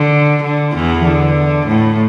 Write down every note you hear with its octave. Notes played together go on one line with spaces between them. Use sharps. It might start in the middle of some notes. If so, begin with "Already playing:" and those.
Already playing: D3
D3
E2 E3
D3
A2